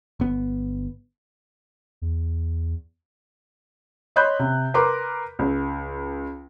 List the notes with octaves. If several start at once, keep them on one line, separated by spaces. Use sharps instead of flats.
G1 B3
E2
C#5 D#5 B5 C6 F#6 G6
C3
A#4 B4 A#5 C6 D6
C#2